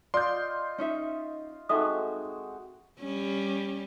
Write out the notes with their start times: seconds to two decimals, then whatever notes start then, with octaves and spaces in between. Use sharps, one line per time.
0.14 F4 D5 D#5 C6 G6
0.78 C#4 D#4 E5
1.69 G#3 C4 D#4 F#4 A4 D#5 E5 D#6
3.00 G3 C#4